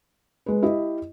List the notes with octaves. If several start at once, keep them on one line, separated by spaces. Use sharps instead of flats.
G#3 B4
E4 G4 D#5